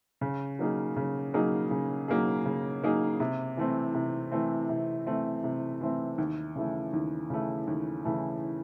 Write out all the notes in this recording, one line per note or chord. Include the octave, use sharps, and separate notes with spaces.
C#3
F#3 A#3 D#4 G#4
C#3
F#3 A#3 D#4 G#4
C#3
F#3 A#3 D#4 G#4
C#3
F#3 A#3 D#4 G#4
C3
E3 A3 C4
C3
E3 A3 C4
C3
E3 A3 C4
C3
E3 A3 C4
D#2
C#3 E3 A3
D#2
C#3 E3 A3
D#2
C#3 E3 A3